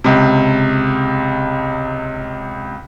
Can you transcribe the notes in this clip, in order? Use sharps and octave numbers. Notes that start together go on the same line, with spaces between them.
C#2 C3